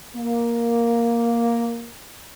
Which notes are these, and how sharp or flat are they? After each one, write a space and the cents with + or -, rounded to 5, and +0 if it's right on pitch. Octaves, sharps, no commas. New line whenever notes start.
A#3 +5